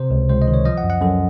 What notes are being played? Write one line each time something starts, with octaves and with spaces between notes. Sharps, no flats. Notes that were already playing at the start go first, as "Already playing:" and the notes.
Already playing: C3 C5
C#2
C#2 C5
D#5
D#3
C#5
F3 D#5
F#5
F#2
F#5
F#2 A4